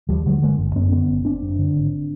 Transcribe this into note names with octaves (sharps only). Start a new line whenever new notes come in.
D#2 F3 G3
D3 F#3 G#3
G1 G#3 A#3
G1
F#2 B3 C#4
D3 B3 C#4
G1
G1 C4 D4
F#2
D3
G#1